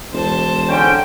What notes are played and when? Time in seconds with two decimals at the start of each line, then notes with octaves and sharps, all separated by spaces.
0.13 E1 C5 A5
0.69 G#2 D3 C#4 G5